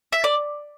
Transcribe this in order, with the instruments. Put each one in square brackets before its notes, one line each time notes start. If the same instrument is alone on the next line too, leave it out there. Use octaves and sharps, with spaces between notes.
[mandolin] E5
D5